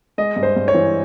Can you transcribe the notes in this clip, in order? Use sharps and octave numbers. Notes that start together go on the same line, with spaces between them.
G#3 D#5
G2
C5
G2
C#5
E3